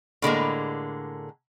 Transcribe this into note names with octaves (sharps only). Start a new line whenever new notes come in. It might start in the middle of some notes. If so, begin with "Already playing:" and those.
A2 D3 G#3 A#3